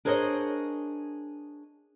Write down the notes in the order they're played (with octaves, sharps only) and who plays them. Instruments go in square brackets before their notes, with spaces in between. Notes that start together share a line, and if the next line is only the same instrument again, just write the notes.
[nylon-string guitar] D4 G#4 A#4 C5 C#5 D#5